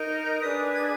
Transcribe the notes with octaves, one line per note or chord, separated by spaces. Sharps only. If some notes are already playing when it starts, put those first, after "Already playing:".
Already playing: D#4 A#4
D4 G#4 B4 D#6
G#6